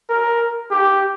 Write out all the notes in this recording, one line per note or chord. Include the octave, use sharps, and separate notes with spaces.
A#4
G4